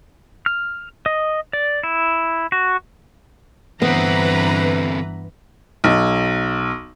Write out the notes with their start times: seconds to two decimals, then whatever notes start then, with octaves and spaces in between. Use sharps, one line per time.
0.46 F6
1.06 D#5
1.53 D5
1.83 E4
2.52 F#4
3.82 G2 D3 E3 B3 C4 B4 A#5 B5
5.84 B1